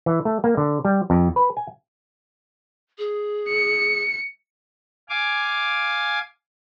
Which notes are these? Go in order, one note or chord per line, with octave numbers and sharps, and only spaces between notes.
E3
A3
A#3
D3
G3
F2
B4
G#5
G#4
C#7
F5 G#5 D6